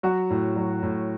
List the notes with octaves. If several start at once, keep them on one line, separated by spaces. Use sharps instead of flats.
F#3 F#4
A2
F#3
A2